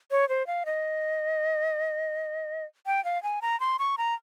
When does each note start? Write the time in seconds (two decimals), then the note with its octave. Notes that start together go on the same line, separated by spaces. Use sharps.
0.11 C#5
0.29 C5
0.47 F5
0.66 D#5
2.86 G5
3.05 F5
3.23 G#5
3.42 A#5
3.60 C6
3.79 C#6
3.98 A#5